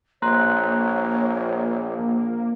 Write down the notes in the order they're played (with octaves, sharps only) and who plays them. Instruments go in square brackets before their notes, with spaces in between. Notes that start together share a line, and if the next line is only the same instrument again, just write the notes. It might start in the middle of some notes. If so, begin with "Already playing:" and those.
[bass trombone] A#1 [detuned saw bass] A#3 [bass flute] C#5 [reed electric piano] A#5 C6 F#6